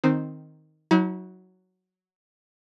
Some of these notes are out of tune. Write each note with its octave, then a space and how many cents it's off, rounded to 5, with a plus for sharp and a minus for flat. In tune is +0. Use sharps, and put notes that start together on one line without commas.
D#3 +0 C4 +0 D#4 -10
F#3 +0 E4 -45